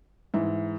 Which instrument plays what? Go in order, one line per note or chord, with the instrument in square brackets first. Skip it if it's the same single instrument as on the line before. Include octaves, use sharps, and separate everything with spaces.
[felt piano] G#2 E3 E5